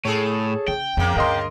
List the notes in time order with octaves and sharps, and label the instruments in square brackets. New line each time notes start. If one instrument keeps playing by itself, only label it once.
[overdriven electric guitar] A2 [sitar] G#4 A4 C#5
[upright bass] C#3 [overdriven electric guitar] G5
[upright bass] F2 [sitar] C#3 A#3
[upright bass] D2 G2 [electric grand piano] A#4 D#5 C6